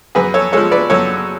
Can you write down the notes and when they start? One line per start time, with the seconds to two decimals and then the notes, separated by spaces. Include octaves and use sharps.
0.15 F#2 G#4 B4
0.34 A4 C#5
0.53 F3 G#3 A4 C#5
0.71 B4 D5
0.90 F#2 A4 C#5